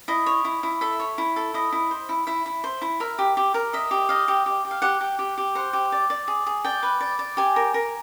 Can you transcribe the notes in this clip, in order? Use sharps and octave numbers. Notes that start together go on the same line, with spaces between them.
E4 D#5
C#5
E4
E4
A4 E5
C#5
E4
A4
E4 D#5
E4
C5
E4
E4 E5
E4
C5
E4
A#4 E5
G4
G4
A#4
D#5 E5
G4
D#5 F5
G4
G4
G4
F5
G4 F#5
G4
G4
G4
C5 F#5
G4
D5
D5
G#4
G#4
D5 G5
B4
D5
D5
G4 G#5
A#4
A#4